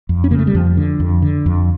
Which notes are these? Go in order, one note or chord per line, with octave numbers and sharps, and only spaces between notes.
F2
C#4
C#3 A#3
A3
G3
F2 F3
D3
F2
D3
F2